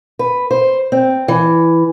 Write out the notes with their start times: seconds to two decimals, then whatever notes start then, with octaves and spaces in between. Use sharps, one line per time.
0.19 B4
0.51 C5
0.92 C4
1.28 E3